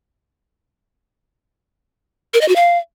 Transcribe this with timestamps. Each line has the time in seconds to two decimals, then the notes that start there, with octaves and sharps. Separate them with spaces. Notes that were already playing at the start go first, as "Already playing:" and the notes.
2.34 A#4
2.41 D#5
2.48 F#4
2.56 F5